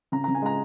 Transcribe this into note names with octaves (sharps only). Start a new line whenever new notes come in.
C#3 A#5
C#3 A#5
G#5
G#3 A#5